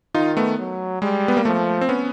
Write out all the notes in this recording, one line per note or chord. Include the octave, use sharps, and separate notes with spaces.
D#3 D#4 F4
A3 B3
F#3
G3 G#3
B3
A#3
F3 A3
C4
B3 C#4